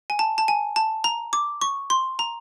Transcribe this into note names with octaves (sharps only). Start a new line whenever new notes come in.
G#5
A5
A5
G#5
A5
A#5
D6
C#6
C6
A#5